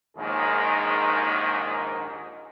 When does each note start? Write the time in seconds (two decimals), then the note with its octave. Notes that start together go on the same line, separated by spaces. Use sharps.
0.16 A#1 D#2 G#2 D#3 G#4